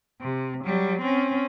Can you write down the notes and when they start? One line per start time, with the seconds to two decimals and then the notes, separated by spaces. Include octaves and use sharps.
0.21 C3
0.65 F#3 G3
1.02 C4 C#4